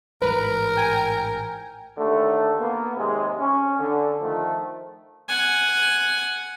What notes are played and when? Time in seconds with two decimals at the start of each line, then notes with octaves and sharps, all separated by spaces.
0.22 A1 G#2 E3 A#4 B4 A#5
0.77 G5 G#5
1.97 D#2 D3 A3
2.59 A#3 B3
2.97 D#2 C3 G#3
3.39 C#4
3.80 D3
4.22 D#3 F3 A3
5.28 F#5 G#5